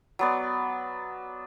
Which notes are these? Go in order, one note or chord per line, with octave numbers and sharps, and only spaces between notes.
F#3 B3 D5